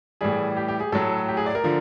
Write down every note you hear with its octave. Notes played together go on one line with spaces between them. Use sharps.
A2 E3 G3 G#4
G4
G4
G#4
A2 F#3 A4
G4
G#4
D5
A#4
D3 F3